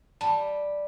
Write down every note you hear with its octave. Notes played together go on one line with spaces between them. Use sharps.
G3 A5